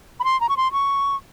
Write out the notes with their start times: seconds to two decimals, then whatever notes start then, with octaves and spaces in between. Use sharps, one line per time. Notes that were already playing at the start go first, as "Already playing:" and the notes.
0.20 B5
0.24 C6
0.41 A#5
0.49 C#6
0.57 C6
0.72 C#6